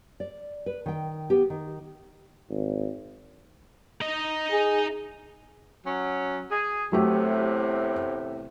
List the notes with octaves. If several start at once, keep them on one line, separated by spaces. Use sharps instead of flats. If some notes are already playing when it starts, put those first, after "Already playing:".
D5
B4
D#3 G5
B3 G4
D#3
G#1
D#4 D#5
G#4
F#3 C#4
G#4
E2 A2 C3 F#3 A3 G4